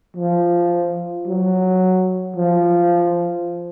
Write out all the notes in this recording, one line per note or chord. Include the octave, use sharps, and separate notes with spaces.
F3
F#3
F3